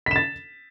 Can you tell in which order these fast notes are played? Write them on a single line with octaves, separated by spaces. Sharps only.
B6 E7 A6